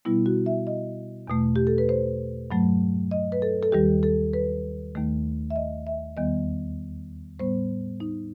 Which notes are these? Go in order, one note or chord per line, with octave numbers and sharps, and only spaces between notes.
B2 G3 B3 E4
F#4
E5
D#5
E2 B2 A3
G4
A4
B4
C5
G2 F#3 A3
D#5
B4
A4
A4
D#2 D#3 G3 G4
A4
B4
D#2 D#3 A3
E5
D#5
E5
E2 D#3 G3 B3 D#5
A2 G3 B3 C5
D#4